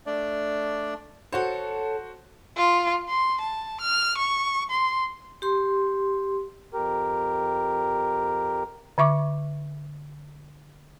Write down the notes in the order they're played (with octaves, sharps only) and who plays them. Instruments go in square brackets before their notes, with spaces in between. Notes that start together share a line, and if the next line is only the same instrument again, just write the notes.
[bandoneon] A3 D4 D5
[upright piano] F#4 C5 [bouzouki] A4 C#5
[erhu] F4
C6
A5
F6
C#6
C6
[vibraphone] G4 C6
[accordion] F2 G4 A#4
[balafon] D3 E5 C#6 D6